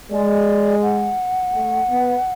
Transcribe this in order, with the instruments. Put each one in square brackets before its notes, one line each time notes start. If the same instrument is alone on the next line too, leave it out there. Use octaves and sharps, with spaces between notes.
[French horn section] G#3 [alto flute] D5
[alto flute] F#5
[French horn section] A3
B3